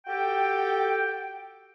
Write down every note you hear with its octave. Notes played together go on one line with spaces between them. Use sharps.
F#4 G4 A4 G5